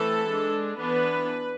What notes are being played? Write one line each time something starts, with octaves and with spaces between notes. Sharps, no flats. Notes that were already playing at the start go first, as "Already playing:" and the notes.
Already playing: E3 A3 C4 A4
G#3 D4
E3 B3 D4 B4